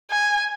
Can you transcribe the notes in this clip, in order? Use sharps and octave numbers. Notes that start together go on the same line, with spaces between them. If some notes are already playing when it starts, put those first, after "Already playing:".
G#5